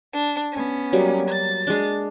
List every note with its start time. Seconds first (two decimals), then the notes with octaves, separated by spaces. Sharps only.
0.13 D4
0.52 B3 C#4
0.93 F#3 G3 A#3
1.29 A6
1.67 G#3 D4